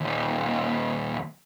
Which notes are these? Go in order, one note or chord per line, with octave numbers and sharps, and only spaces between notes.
D#2 A#2